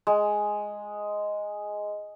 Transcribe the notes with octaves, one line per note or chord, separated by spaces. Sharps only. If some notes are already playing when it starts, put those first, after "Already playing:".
G#3